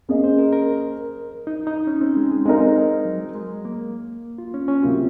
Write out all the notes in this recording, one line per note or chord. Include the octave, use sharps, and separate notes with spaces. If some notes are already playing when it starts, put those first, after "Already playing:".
A#3 C#4 G#4 D#5
C5
A#4
A#4
D#4
D#4
C#4
C4
G#3
G#3
G#3 C4 D#4 A#4
F#3
G#3
A#3
F4
C#4
C#4
C3 F#3 A#3 C4 F4